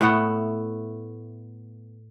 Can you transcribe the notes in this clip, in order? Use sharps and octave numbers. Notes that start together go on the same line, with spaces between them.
A2 A3 B3 F#5